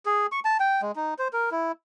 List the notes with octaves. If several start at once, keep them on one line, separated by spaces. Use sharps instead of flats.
G#4
C#6
A5
G5
G#3
D#4
C5
A#4
E4